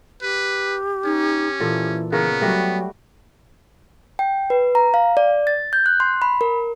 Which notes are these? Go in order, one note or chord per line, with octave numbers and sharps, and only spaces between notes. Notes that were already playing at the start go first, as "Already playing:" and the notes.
G4 B4
C#4 D#4
A#2 E3 A4
C#3 B3 A#4 C#5
F#3 G3 A3 F#4 G5
G5
B4
A#5
F5
D5
A6
G6
F#6
C6
B5
A#4